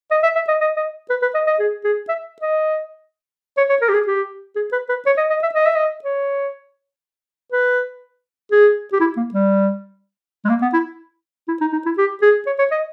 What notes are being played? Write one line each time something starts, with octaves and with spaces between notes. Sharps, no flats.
D#5
E5
E5
D#5
D#5
D#5
B4
B4
D#5
D#5
G#4
G#4
E5
D#5
C#5
C#5
A#4
G4
G#4
G4
G#4
B4
B4
C#5
D#5
D#5
E5
D#5
E5
D#5
C#5
B4
G#4
G4
E4
A#3
G3
G#3
A#3
B3
E4
E4
D#4
D#4
E4
G4
G#4
C#5
C#5
D#5